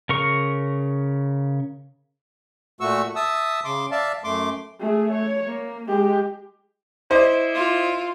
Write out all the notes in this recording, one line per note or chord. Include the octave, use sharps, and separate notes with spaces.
C#3 A#4 C#6
A#2 A3 F#4 C#6 E6
E5 A5 D#6 E6
C#3 C6 D6
D5 E5 F5 A5
F#2 A3 C6 D6
A3 G#4
C#5
A#3
G#3 G4
E4 C5 D5 D#5
F4